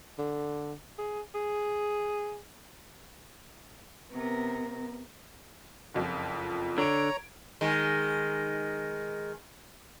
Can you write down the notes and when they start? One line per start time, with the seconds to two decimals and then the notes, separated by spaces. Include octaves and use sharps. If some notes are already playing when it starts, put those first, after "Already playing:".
0.19 D3
0.99 G#4
1.35 G#4
4.13 C3 B3 A#4
5.94 F#1 F2 F3
6.78 D3 C#5 A#5 G#6 D7
7.61 D#3 G#3